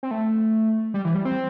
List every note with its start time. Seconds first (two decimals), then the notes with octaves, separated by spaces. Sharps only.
0.03 C4
0.11 A3
0.94 G3
1.05 E3
1.15 G3
1.25 C4